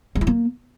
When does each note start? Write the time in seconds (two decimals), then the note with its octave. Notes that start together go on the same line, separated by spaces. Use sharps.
0.15 G#3
0.21 E4
0.27 A#3